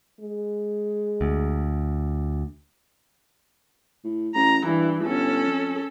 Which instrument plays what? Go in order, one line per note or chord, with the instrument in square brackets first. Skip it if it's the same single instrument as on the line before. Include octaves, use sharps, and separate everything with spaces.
[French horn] G#3
[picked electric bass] D2
[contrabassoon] A2
[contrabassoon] A1 [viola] A#5
[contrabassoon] G2 [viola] E3
[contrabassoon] G1 [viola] C#4 A4
[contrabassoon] F2